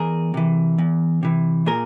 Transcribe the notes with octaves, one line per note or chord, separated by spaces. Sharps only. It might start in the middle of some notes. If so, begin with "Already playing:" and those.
Already playing: E2 G#4 A#4
C3 E3
E2
C3 E3
A#2 G#4 A#4